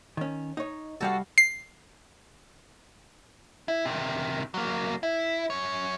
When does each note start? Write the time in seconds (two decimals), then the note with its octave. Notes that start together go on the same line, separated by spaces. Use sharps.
0.17 D#3 C#4
0.57 D#4 C#5
1.01 C2 G3 F#4 A4 F5
1.38 C7
3.68 E4
3.85 C3 D#3
4.54 F#3 A#3
5.03 E4
5.50 F#2 C#5